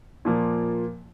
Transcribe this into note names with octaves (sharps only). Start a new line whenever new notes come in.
A#2 F3 A#3